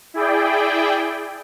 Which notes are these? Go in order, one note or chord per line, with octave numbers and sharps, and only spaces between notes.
E4 G#4 D5 G5